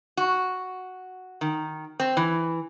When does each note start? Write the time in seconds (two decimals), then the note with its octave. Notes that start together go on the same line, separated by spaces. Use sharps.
0.17 F#4
1.41 D#3
2.00 C4
2.17 E3